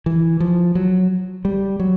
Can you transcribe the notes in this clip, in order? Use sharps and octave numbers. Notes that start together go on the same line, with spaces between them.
E3
F3
F#3
G3
F#3